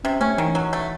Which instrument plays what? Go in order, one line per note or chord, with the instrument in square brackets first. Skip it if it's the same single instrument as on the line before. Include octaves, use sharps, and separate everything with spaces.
[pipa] C3 [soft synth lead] C#4
[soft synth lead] A3 [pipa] C#4
[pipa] D#3 [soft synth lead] E3
[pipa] F#3
A3